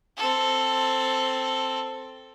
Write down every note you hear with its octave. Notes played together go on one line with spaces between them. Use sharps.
C4 A4